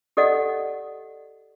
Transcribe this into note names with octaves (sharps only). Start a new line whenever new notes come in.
G4 A4 D5 D#5 F#5